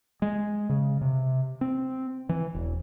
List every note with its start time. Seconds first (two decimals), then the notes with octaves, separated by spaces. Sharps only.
0.22 G#3
0.69 C#3
1.01 C3
1.61 C4
2.29 E3
2.55 E1